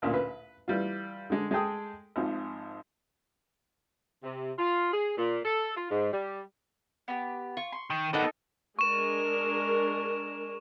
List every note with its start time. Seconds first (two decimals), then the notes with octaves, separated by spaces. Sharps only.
0.02 A1 D2 A#2
0.14 B4
0.68 E3 G3 F4
1.30 D3 G#3
1.51 G#3 G#4 A4 G5 D#6
2.16 G#1 G#2 F3
4.23 C3
4.58 F4
4.93 G#4
5.18 A#2
5.45 A4
5.77 F4
5.91 G#2
6.13 G3
7.08 B3 G4
7.57 F4 C#6
7.72 C6
7.90 D#3
8.13 B3 D4 D#4 G4 A4 A#4 F#5
8.79 G#3 D4 A#4 C#6 E7